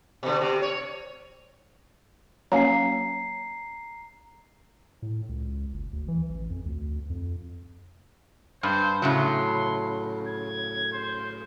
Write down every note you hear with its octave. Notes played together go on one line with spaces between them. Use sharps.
B2 D3
C3
C#5
F#3 A#3 C#4 A#5 C7
A2
C#2
F#1
D2
E3
A1
F2
D2
F2
G2 C5
A2 C#3 F#3 C6
G#6
C5